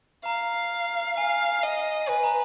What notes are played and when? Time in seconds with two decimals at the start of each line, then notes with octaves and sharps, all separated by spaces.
0.25 F5 A#5
1.17 F5 G#5
1.63 D#5
2.09 B4 G#5
2.24 A#5